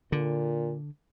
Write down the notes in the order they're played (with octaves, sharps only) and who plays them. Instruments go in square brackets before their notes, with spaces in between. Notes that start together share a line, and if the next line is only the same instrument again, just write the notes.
[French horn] A#2 [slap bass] D3